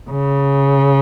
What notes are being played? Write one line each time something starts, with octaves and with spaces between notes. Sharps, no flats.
C#3